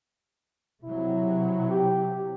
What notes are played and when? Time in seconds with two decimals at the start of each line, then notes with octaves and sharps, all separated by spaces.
0.84 C3 F#3 E4
1.70 G4